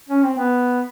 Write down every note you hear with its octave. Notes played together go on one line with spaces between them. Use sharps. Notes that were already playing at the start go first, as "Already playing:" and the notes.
C#4
C4
B3